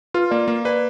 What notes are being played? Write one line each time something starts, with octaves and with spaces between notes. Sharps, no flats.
F4 B4
A#3 D5
A#3
B4 D5